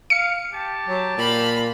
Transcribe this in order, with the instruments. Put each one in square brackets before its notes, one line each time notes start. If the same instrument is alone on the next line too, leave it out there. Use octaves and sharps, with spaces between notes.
[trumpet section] F5 [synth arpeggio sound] C#7
[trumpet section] G4 G5 A5
[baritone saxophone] F#3
[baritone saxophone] A#2 [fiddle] F5 B5